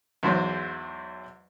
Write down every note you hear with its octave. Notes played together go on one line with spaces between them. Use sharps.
E2 G#2 F#3 C5